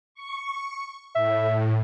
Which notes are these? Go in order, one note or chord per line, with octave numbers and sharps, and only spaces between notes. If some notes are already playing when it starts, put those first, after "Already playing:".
C#6
A2 E5